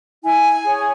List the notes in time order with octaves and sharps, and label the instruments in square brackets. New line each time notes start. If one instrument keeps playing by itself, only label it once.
[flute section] E4 G#5
G#4 C#5